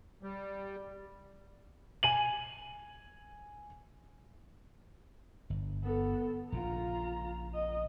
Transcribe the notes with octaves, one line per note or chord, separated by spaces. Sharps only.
G3
G#5 D#7 F#7
G1
B3 A4
A#1 C#3 F4 A#5
D#5